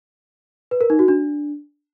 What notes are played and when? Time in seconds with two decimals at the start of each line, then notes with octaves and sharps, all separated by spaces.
0.71 B4
0.81 A#4
0.90 D#4
0.99 F#4
1.08 D4